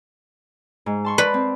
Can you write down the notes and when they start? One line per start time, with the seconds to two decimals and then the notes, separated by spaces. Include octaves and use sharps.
0.86 G#2
1.05 A5 C6 C#6
1.18 B4 D5
1.34 C4